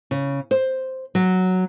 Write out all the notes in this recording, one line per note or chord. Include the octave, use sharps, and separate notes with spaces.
C#3
C5
F#3